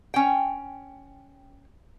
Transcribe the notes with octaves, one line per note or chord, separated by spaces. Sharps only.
C#4 G5